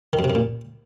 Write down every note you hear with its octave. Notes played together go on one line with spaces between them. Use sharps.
D#3
F#2
C3
F#2
A#2